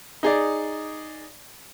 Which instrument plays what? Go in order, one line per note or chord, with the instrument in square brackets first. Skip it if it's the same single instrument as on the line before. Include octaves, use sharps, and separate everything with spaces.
[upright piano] D#4 G#4 D5